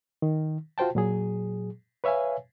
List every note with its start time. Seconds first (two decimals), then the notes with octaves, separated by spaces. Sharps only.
0.22 D#3
0.78 F4 F#4 C5 G5 A5
0.95 A#2 F#3 G#4
2.04 B4 C#5 E5 F5 G#5